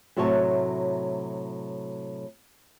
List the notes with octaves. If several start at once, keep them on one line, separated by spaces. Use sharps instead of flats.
A2 C3 F#3 F#4 C#5 A5